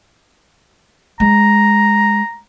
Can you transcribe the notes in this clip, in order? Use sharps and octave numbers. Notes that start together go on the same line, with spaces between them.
G#3 A#5